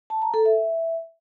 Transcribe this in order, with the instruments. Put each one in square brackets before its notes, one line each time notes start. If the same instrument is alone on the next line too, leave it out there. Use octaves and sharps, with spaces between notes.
[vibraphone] A5
A#5
A4
E5